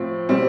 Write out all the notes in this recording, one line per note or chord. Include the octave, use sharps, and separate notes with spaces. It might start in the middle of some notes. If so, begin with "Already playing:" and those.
Already playing: A2 F3 C4
B2 G3 C4